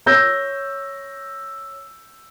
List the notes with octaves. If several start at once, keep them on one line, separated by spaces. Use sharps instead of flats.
C#5 E6 G6 A#6